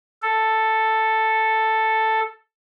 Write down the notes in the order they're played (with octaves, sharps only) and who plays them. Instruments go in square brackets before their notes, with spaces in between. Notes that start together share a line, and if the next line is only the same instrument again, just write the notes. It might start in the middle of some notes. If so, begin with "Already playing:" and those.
[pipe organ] A4